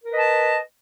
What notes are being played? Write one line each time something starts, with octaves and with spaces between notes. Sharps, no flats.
A#4 B4 D#5 A5